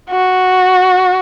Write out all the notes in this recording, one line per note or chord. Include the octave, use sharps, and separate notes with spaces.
F#4